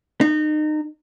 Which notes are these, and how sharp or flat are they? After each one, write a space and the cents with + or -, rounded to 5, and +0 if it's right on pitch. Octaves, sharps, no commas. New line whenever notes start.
D#4 -30